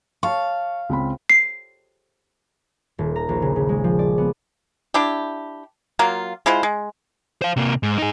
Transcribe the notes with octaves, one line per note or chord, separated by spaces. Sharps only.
C#5 F5 A5 C#6
C#2 C4 B5
C7
D#1
A#5
A#1
C#3
C#3
G#3
F3
D5
B3
D4 E4 G4
F#3 A#3 F4
G#3 E4 F4 C5
G#3
C5 F5
C3 A#3
G#2
D#4 G#4